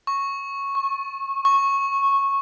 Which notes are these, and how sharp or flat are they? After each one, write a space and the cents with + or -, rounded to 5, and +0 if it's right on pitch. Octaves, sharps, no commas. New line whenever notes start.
C#6 -5
C#6 -25
C#6 -10